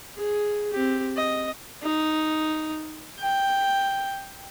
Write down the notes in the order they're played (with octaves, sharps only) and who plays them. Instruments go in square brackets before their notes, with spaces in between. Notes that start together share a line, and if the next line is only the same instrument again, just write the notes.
[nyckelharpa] G#4
C4 G4
D#5
D#4
G5